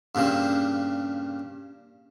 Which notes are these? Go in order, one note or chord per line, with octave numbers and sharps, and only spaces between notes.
G2 A#2 C#3 C4